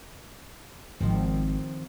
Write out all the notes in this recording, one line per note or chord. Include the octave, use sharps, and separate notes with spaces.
G#1 D#3 F3 C4